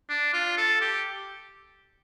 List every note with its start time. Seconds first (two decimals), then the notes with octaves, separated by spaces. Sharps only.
0.09 D4
0.34 F4
0.57 A4
0.82 G4